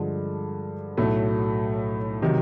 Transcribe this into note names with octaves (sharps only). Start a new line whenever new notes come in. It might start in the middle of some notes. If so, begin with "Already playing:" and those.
Already playing: G2 D3 F3 G#3
B1 A2 F#3 A3
C3 D#3 F#3